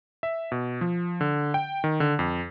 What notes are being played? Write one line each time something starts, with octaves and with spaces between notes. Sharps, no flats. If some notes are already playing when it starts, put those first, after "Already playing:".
E5
B2
F3
D3
G5
D#3
D3
F2